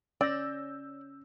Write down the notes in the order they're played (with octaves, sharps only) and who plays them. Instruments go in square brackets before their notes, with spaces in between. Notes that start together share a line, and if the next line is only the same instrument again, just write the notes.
[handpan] C#4 [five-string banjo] D5 [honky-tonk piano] E6 G6 A#6